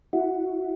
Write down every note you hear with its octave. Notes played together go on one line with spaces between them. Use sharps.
E4 F#4